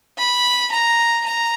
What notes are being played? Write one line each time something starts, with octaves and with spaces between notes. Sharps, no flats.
B5
A#5
A#5